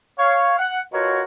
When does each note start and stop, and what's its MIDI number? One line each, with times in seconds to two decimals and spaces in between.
0.18 0.57 73
0.18 0.57 77
0.58 0.79 78
0.93 1.22 47
0.93 1.22 65
0.93 1.22 66
0.93 1.22 70
0.93 1.22 73